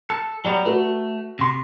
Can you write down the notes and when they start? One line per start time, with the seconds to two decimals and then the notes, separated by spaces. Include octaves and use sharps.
0.10 A4
0.45 F#3 G3 B3 D5 A#5
0.65 A3 F#4 A4 B4
1.39 C3 C6